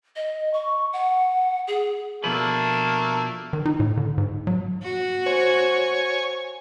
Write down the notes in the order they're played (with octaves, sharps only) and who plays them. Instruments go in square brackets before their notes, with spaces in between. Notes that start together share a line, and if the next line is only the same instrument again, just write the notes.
[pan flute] D#5
C#6
F#5
G#4
[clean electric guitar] B2 F3 B4 [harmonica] A3 A#3 D4
[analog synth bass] D#3
D#4
A2
D3
G#2
F#3
[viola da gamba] F#4
[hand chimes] C5 [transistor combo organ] C#5 G#5